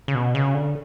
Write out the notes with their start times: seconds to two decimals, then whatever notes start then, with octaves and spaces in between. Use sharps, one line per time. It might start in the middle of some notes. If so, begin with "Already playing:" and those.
0.08 C#3
0.15 B2
0.35 C#3
0.54 D3